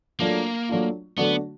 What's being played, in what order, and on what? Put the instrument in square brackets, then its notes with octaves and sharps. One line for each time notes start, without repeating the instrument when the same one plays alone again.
[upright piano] F#3 A3 D4 F4 [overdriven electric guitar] A#3
[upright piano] F#3 A3 D4 F4
[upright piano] D3 F#3 A3 D4 F#4 [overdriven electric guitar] B3